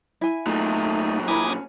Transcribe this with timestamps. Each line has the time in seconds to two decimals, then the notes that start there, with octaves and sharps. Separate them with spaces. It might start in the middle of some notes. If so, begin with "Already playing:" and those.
0.21 E4 G#5
0.46 A#2 F#3 A3 D#4
1.28 E4 A#4 G#5 B5 D6 D#6
1.49 C#4